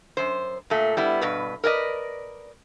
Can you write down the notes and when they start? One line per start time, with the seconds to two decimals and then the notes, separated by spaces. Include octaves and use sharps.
0.17 F#2 C5
0.70 A#2 A3
0.97 G3 B3 E4
1.21 G2 B2 B4
1.64 A#4 B4 D5 D#5